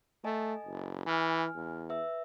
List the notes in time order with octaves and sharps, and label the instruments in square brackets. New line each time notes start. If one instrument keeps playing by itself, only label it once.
[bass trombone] A3 [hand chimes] A4 D#5 G#5
[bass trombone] F#1
[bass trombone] E3 [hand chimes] G#5 F6
[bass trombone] E2
[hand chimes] B4 E5 E6